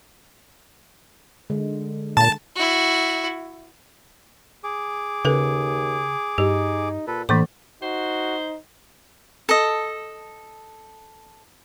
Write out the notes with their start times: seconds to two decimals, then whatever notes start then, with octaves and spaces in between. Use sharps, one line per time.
1.50 D3 G#3
2.17 A#2 A5
2.55 E4 F#4
4.64 G#4 D6
5.25 D#2 C#3 A4 B4
6.38 G2 D#4 G4
7.07 A#2 A4 B4
7.29 A2 D3 E3 A#3 C5 B5 D6
7.82 D#4 F#4 C5
9.49 A4 D#5